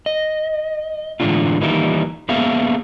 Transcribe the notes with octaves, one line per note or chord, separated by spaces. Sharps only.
D#5
A2 D3 E3 G#3 D4 F4
D#3 E3 G3 A#3 D#4 E4
A#3 B3 G#4 E5 F5